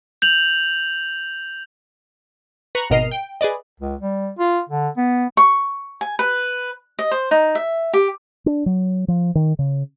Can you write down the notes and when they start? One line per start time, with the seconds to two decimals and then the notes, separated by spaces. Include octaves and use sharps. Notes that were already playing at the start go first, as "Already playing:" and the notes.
0.22 G6 F7 F#7
2.75 B4 A#5 C#6 F#6
2.90 G#1 B2 A#4 D#5 F6 C7
3.11 G5
3.41 G#4 B4 D5 D#5
3.80 C#2
4.01 G3
4.39 F4
4.69 D3
4.97 B3
5.37 C#6
6.01 G#5
6.19 B4
6.99 D#5
7.11 C5
7.31 D#4
7.55 E5
7.93 G4
8.46 D4
8.66 F#3
9.08 F3
9.35 D#3
9.59 C#3